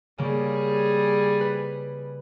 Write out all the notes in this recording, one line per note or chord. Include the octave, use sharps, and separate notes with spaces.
C#3 G3 A#3 G#4
B4